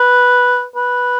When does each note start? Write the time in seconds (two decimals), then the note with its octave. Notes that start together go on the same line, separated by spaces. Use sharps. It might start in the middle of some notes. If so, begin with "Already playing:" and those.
Already playing: B4
0.76 B4